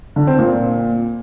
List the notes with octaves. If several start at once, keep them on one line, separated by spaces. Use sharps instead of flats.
D3
C4
A#2